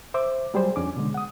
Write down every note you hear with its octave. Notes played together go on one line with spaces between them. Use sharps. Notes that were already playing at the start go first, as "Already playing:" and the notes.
C5 E5 D6
F#3 G3 G#4 C5
F2 C#4 D4 G#5 D6
B2 D3 G#3
F#5 D#6